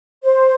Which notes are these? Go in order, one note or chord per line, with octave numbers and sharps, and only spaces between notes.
C5